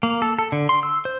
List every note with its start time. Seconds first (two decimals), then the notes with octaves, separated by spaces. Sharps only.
0.03 A#3
0.22 A4
0.39 A4
0.52 D3
0.69 C6
0.83 E6
1.05 C5